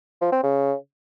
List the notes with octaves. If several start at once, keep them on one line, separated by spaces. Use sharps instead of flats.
F3
C4
C#3